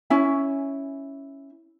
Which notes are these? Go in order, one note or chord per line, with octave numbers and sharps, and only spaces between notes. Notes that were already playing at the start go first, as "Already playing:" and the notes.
C#4 E4 G#5